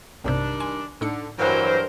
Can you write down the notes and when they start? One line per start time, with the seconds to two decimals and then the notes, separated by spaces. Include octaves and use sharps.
0.24 B1 G2 C3 D#3 G3 D4
0.60 G#5 C6
1.01 A2 D3 D#4 C#7
1.39 G2 E3 F#3 A#4 C5